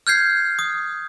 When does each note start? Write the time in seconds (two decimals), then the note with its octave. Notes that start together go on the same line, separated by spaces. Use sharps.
0.07 F6 G6 G#6 C7
0.59 D#6